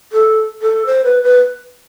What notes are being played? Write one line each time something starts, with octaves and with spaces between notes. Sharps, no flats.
A4
A4
C5
B4
B4